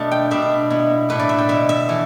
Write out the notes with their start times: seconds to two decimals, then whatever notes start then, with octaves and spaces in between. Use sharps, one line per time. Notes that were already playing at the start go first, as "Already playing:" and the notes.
Already playing: B2 A3 D4 A5
0.11 G5
0.31 B2 G3 D4 E5
0.70 B2 B3 E4
1.09 A2 A3 D4 B4
1.19 D5
1.29 E5
1.38 G5
1.49 B2 B3 E4 E5
1.69 E5
1.89 E3 A3